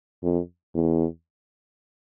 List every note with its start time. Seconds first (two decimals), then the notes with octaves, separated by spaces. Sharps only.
0.23 F2
0.75 E2